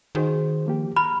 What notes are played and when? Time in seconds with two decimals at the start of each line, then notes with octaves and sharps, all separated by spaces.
0.15 D#3 F#4 G#4 C5
0.66 F3 A#3 G4
0.96 A#5 B5 F6